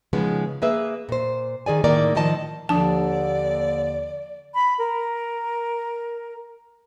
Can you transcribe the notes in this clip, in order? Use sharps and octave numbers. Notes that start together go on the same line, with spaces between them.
C#3 F3 G#3 B3 D#4
A#3 G#4 B4 E5
A#2 C5
D#3 G#4 D5 G#5
A2 D#3 A#3 D#4 A#4 D5
A2 D#3 F3 D#5 A5
D#2 D3 F3 D4 D5 A5 D#6
B5
A#4